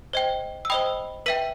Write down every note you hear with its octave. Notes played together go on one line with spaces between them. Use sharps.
C5 D#5 G5
E6
C5 D#5 G5 B5 D#6
B4 E5 G5 B6 D#7